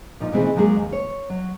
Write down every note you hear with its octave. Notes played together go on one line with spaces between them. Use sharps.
A#2 F3 D#4 F4
B2 D#3 E3 A3 C4 G#4
F3 F#3 G#3 A#3 G#4
D#2
C#5
F#3